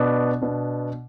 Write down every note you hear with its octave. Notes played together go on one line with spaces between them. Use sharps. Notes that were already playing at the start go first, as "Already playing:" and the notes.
Already playing: B2 B3 D4
B2 B3 D4